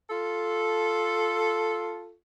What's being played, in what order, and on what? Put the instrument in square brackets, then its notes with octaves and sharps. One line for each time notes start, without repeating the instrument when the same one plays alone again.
[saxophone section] F4 A4